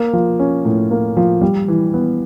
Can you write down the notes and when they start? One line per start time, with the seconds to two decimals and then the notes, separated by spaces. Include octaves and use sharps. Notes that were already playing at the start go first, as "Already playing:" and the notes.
Already playing: A#3
0.13 F3
0.39 C#4
0.65 A2
0.91 A#3
1.17 F3
1.41 G3
1.68 E3
1.94 B3